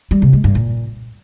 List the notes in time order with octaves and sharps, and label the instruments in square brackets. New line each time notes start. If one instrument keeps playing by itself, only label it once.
[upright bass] G3
C3
G#3
G2
A#2